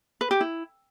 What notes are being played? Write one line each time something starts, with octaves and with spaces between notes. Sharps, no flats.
B4
G4
E4